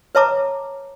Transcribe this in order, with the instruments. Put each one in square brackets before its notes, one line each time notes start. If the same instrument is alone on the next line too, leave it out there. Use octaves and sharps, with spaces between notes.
[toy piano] B4 C#5 E5 A5 A#5 D6